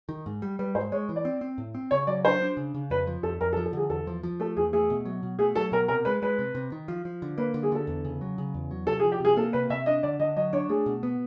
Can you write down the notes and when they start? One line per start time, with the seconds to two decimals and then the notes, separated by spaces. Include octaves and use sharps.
0.09 D#3
0.26 G#2
0.42 G3
0.59 G3 B4
0.75 G#2 C5
0.92 G#3 C#5
1.09 E3
1.16 D5
1.25 C4
1.41 C4
1.58 A2
1.75 C4
1.91 C#3 C#5
2.07 F#3 D5
2.25 D4 C5
2.41 D4
2.57 C#3
2.74 C#3
2.90 F2 B4
3.07 F3
3.23 F2 A4
3.41 F2 A#4
3.53 A4
3.57 F3
3.65 A4
3.73 D3 G#4
3.90 E2 A4
4.07 F3
4.23 F3
4.40 A3 A4
4.57 E2 G#4
4.73 A3 G#4
4.90 B2
5.05 F#3
5.23 B2
5.39 A3 G#4
5.55 F#3 A4
5.72 B2 A#4
5.88 C3 A#4
6.05 G#3 B4
6.22 G#3 B4
6.39 C3
6.55 C3
6.72 D#3
6.88 F3
7.05 F3
7.22 D3
7.38 A#3 B4
7.54 D3
7.63 G#4
7.72 D3 A4
7.87 E2
8.05 C#3
8.21 F#3
8.38 C#3
8.54 E2
8.71 F#3
8.87 C3 A4
9.00 G#4
9.04 F3
9.12 G4
9.20 C3 G#4
9.37 A#3 A4
9.53 C3 B4
9.70 C3 E5
9.86 D4 D#5
10.03 D3 D5
10.20 D3 D#5
10.36 F#3 D#5
10.53 D4 C#5
10.69 A3 G#4
10.86 B2
11.03 B3